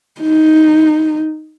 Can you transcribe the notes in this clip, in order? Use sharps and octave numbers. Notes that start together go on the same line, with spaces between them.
D#4